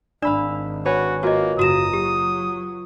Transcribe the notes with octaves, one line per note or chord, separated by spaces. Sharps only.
G#1 D4 D5 F5 B5 E6
F#4 B4 C#5 G#5
A#3 F4 F#4 D#5
F#1 F4 F#4 A#5 D#6 E7
F#3 G4